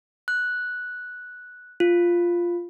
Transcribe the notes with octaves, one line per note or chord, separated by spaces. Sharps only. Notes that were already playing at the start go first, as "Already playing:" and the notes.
F#6
F4